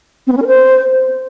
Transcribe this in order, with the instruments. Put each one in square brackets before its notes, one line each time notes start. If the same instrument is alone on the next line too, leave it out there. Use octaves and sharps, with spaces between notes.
[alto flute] C4
B3
C#4
A#4
C5